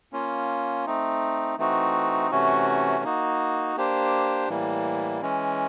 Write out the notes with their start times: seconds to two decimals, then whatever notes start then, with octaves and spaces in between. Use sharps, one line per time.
0.13 A#3 C#4 F4
0.86 A3 C4 D#4
1.58 E3 A3 C4 D#4 F#4
2.31 C3 E3 A3 C#4 F#4
3.04 A#3 D#4 F#4
3.77 A#3 D4 G4 C5
4.48 A2 E3 G3 A#3
5.22 E3 G#3 C#4